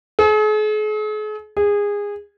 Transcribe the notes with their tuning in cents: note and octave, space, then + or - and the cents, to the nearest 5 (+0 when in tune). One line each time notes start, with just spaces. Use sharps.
G#4 +45
G#4 -20